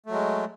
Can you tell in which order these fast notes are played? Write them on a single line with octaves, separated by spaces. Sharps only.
A3 F#3 G#3